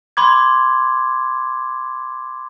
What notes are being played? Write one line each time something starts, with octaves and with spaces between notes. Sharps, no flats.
B5 C6 D6 G#6